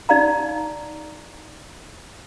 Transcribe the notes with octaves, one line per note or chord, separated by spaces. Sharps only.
D#4 D5 F5 A#5